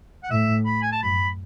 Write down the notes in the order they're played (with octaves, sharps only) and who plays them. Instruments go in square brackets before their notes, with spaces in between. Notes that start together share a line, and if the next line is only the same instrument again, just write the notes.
[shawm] F#5
[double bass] A2 [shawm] E5
[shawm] B5
G#5
A5
[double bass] F#2 [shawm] B5